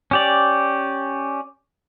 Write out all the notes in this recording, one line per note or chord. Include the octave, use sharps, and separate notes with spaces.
C#4 G4 D5